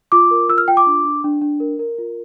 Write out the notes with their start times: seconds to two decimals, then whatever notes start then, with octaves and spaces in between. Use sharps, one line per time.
0.12 F4 D6
0.31 A#4
0.49 F4 E6
0.58 F6
0.68 F4 G5
0.77 D6
0.87 D4
1.05 D4
1.24 D4
1.42 D4
1.60 A#4
1.79 A#4
1.98 F4